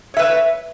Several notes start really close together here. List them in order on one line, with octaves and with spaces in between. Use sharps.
C#5 E5 B4